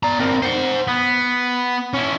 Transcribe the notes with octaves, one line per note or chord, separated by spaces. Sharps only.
D5 A#5
C4 A#4
C5 F#5
B3
C#4 E4